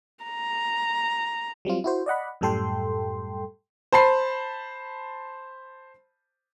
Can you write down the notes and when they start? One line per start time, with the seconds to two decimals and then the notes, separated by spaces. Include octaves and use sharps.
0.24 A#5
1.65 F#3 G3 C4 F4
1.84 E4 F#4 C5
2.06 D5 D#5 F#5 B5
2.41 F#2 A2 G3 A4 G5 C6
3.92 C5 A5 B5 C7